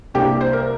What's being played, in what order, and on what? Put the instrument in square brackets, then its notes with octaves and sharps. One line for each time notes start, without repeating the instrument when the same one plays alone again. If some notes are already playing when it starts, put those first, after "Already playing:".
[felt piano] C2 C3 A#3 D4 G4
C5
A#4